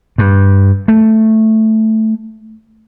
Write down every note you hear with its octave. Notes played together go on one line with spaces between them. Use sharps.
G2
A3